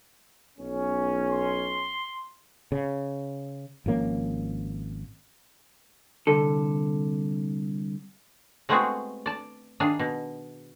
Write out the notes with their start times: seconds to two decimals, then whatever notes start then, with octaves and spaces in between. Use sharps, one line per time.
0.59 B1 C#4
1.31 C6
2.72 C#3
3.86 G#1 F3 A#3 C#4
6.27 C2 D3 A4
8.69 G#3 A3 B3 C4 F#4 G#4
9.26 D5 A5
9.80 D#3 D4 G#4 F5
9.99 B2